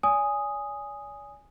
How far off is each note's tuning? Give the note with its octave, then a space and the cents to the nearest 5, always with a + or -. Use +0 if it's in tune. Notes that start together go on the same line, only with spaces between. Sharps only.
D5 -40 G#5 -5 D#6 +0